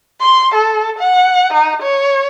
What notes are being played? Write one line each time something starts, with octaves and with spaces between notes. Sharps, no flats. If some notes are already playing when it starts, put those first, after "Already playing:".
C6
A4
F#5
D#4
C#5